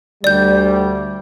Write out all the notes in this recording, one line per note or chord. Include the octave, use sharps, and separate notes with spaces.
D2 G3 D5 G6